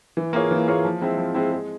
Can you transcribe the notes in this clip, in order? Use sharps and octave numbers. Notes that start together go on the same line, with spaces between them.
E3
A#3 F4 G#4 C#5
E3
A#3 F4 G#4 C#5
F3
G#3 C4 E4
F3
G#3 C4 E4
G#3